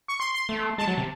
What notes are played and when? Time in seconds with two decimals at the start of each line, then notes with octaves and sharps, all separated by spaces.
0.08 C#6
0.20 C6
0.34 C6
0.49 A3
0.78 G#3 A5
0.88 F#3
0.98 C3